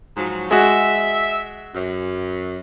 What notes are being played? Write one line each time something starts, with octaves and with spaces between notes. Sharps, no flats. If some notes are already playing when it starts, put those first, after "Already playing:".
G#2 F3 F#3
G#3 F#4 E5
F#2